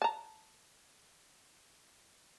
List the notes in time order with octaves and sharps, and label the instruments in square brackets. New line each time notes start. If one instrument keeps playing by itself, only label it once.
[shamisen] A5 A#5